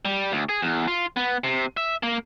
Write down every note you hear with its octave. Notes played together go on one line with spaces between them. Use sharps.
G3
D2
G#4
E2
F4
B3
C3
E5
A#3